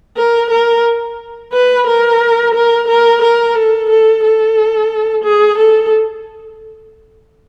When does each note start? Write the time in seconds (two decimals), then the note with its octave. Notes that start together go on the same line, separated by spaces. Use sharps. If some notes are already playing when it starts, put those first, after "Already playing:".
0.17 A#4
0.51 A#4
1.53 B4
1.87 A#4
2.55 A#4
2.88 A#4
3.22 A#4
3.55 A4
3.89 A4
4.24 A4
5.25 G#4
5.59 A4